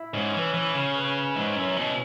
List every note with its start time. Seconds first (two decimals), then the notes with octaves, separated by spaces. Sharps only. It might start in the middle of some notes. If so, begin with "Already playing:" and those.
Already playing: E4 E5
0.13 G#2 C#4 C#5
0.28 C#4 C#5
0.33 E3 B4
0.44 C#4 C#5
0.54 E3
0.59 E4 E5
0.74 C#3 C#4 C#5
0.95 B4
1.04 C#4 C#5
1.35 G#2 E5
1.47 C#5
1.56 F#2 E4 E5
1.77 B2